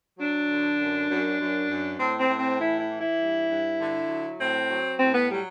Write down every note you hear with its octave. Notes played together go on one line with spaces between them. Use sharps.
F#3 D4
D3
F#2
F#2
F#2
F#2
A2 C4
C4
A2
C4
E3 E4
E4
E3
E4
G2
G2
D3
F#3
A2 C4
F#3
A2 C4
B3
F#3 G3